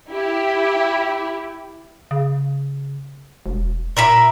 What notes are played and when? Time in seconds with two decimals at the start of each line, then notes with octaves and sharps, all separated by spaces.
0.12 E4 G4
2.11 C#3
3.46 E1
3.97 A#2 A#4 E5 B5